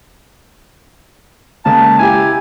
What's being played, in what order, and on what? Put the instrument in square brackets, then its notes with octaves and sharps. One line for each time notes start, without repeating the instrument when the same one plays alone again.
[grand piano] C#3 G#3 A#3 [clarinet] A5
[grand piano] E4 G4 [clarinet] G#5